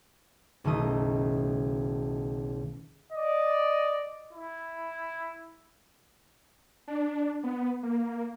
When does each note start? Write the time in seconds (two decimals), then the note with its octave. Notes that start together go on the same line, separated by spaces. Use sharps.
0.64 F#1 B1 D#3 A3 D#6
3.13 D5 D#5
4.33 E4
6.88 D4
7.44 B3
7.83 A#3